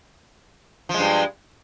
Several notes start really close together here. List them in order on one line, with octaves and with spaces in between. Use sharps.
F3 G#3 G2